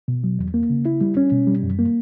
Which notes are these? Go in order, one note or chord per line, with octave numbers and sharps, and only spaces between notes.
B2
F#3
E2
A#3
C#3
E4
G3
C#4
B2
G3
F#2
A#3